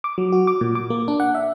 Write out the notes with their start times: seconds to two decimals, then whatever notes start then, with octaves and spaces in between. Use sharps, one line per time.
0.04 D6
0.18 F#3
0.32 F#4
0.47 D6
0.61 A#2
0.75 D6
0.90 A#3
1.08 D4
1.20 F#5
1.35 E5